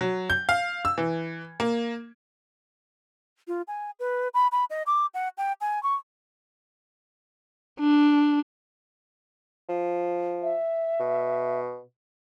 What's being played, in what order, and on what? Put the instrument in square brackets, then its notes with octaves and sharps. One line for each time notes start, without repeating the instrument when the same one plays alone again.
[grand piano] F#3
G6
F5
E6
E3
A#3
[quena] F4
G#5
B4
B5
B5
D#5
D6
F#5
G5
G#5
C#6
[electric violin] D4
[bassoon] F3
[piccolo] E5
[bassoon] B2